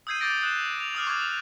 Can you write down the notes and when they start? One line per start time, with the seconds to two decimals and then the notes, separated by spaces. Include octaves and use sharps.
0.07 D#6 E6 G6 G#6 C7 D#7
0.20 D6 G6 A6 A#6 D7
0.41 D#6 F#6 E7
0.80 F7
0.95 D6 D#6 F6
1.07 C#6 D6 F6 G#6